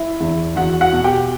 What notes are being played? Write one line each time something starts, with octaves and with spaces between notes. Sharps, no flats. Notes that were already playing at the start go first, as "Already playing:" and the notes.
Already playing: E4 E5
E2
E2 F#4 F#5
F#4 F#5
B2
G4 G5